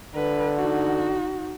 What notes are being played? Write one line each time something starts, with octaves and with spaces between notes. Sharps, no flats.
D3 B4
D#4 F#4